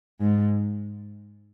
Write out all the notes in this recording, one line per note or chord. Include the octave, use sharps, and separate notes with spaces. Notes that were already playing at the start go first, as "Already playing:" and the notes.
G#2